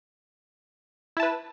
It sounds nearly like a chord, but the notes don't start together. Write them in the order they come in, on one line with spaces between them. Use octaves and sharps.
E4 A5 B4